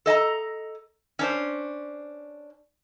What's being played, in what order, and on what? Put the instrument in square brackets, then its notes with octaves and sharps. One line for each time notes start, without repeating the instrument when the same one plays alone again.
[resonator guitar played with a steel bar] A4 D#5 A5 A#5
C#4 D4 C5